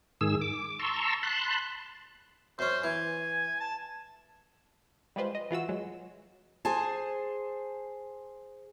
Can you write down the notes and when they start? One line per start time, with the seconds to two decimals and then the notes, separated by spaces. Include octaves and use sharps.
0.21 G#2 D#3 G#4 E6
0.41 D6
0.79 A5 A#5 C6 C#6 E6
1.23 A5 B5 C6 F#6
2.59 F#2 C#4 C5
2.84 E3 G#5
3.60 A5
5.16 G3 G#3 F4 B4 C5
5.35 D#5
5.50 E3 F4 F#4 E6
5.69 F#3 G#3
6.65 G#4 C5 G#5 A5